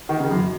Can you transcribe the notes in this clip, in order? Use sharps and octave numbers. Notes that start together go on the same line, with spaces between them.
D#3
C#3
F#2